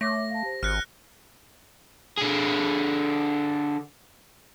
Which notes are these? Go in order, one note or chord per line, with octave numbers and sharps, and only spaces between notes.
A3 C#5 D6 A#6
F5 A5
G4 C5
G#1 F6 F#6 C#7
D3 G#4